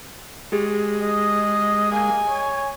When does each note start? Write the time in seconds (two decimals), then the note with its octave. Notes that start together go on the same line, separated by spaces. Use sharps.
0.52 G#3 G4 G#4
1.03 D#5
1.92 A#3 G#5
2.28 C#5